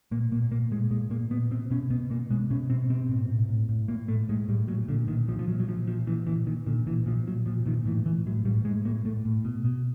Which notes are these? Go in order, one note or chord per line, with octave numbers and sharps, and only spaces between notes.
A#2 A#3
A#2 A#3
A#2 A#3
A#2 G#3
A#2 G#3
A#2 A#3
A#2 B3
B2 C4
B2 C#4
B2 B3
B2 A#3
B2 G#3
B2 C#4
B2 C4
B2 C4
A2
A2
A2
A2
A2 A#3
A2 A3
A2 G#3
A2 G3
A#2 F#3
A#2 D3
A#2 D#3
A#2 F3
F3
A#2 F#3
F#3
A#2 F3
A#2 F3
A#2 E3
A#2 E3
A#2 D#3
A#2 D3
A#2 E3
A#2 F3
A#2 F#3
A#2 F3
A#2 D#3
A2 E3
A2 E3
A2 F#3
A2 G3
A2 G#3
A2 A#3
A2 A3
A2
B2
B2